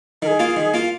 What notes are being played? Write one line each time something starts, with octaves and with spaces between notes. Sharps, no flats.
D#3 G#4 A#4
A#3 F4
D#3
A#3 F4